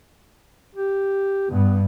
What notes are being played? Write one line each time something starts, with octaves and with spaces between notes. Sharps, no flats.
G4
G2 B3